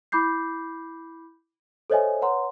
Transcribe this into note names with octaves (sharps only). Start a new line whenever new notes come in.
E4 B5 D6 G6 C7
A4 C5 C#5 D#5 E5 G#5
B4 C#5 F#5 A#5 C6